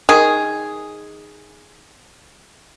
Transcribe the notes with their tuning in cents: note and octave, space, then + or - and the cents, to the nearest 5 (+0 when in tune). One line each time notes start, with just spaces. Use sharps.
D#3 +0 G#4 +0